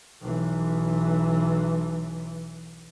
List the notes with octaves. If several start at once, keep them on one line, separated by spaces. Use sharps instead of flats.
B1 E3